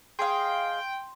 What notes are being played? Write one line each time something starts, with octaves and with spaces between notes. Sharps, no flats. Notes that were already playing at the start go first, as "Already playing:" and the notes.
G#4 D#5 F5 G5 C6